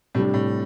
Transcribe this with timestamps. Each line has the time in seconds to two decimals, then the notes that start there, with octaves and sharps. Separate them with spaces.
0.15 A2 C3 G3 D4
0.34 A2